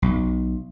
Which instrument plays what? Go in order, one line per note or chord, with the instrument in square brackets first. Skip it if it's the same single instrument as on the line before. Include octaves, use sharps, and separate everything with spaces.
[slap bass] B1